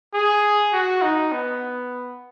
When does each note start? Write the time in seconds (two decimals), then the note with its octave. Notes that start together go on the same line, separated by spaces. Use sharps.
0.14 G#4
0.73 F#4
1.02 D#4
1.32 B3